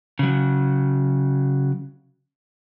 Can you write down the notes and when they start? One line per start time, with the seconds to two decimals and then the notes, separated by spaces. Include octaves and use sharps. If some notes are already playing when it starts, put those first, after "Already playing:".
0.19 C#3 F#3